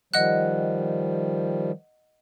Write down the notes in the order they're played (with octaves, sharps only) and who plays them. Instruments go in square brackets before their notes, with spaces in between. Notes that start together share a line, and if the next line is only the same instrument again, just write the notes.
[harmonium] D#3 F3 G3 [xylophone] D#5 F#5 F#6